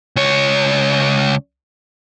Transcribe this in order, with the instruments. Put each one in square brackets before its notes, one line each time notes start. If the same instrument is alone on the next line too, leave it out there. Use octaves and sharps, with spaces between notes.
[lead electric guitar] C#2 C#5